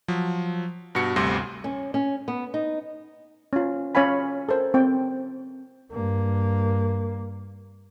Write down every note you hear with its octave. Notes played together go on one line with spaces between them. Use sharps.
F3 F#3
G2 B2 F#4 C#7
G1 D2 C3 G3 C6 A#6
C#4
C#4
B3
D#4
C#4 F4
C#4 C#5 F5 G#5 B5
A4 A#4 C5
C4 G5
G2 A#3